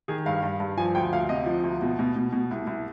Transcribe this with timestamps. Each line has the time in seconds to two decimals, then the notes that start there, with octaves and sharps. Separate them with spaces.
0.08 D#3 G#4
0.26 G2 F5
0.43 G2
0.60 G2
0.78 F3 G#5
0.95 D2 G5
1.13 D2 F5
1.29 C3 D#5
1.46 F3
1.64 D2
1.82 B2
1.99 B2
2.16 B2
2.33 B2
2.51 C2
2.67 C2